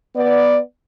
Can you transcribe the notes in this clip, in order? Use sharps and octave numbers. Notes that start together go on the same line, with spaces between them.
B3 D5